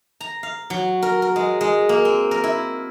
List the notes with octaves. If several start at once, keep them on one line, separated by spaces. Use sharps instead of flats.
A#5
F5
F#3
A#4
A#4
G#3
G#3
A#3
C4
A#4
E4